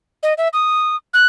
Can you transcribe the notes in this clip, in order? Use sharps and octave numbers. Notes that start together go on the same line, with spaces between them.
D#5
E5
D#6
F#6